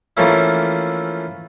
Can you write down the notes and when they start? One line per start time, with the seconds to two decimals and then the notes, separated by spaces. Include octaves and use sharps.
0.17 E3 F3 A3 A#3 C#4 E4